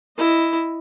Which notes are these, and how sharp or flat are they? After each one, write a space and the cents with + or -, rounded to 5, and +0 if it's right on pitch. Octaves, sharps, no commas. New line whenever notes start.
E4 +0 D#5 +0